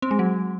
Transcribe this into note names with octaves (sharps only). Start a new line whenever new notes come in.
C4
G#3
F#3